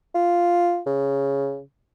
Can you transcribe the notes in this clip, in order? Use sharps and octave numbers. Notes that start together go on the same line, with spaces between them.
F4
C#3